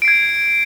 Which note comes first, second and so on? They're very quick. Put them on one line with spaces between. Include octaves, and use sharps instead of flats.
D7 C7 G#6